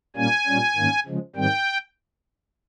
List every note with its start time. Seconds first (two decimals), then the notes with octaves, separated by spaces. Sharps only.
0.16 A#2 G3 A#3 C#4 G#5
0.47 A#2 G3 C#4
0.76 G#2 D#3 A#3 C#4
1.06 C#3 F3 G#3
1.36 G#2 D#3 G3 C4 G5